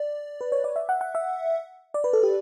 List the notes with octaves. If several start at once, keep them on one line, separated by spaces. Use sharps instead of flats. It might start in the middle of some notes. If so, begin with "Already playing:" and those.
Already playing: D5
B4
C#5
D5
E5
F#5
F#5
E5
D5
B4
A4
G4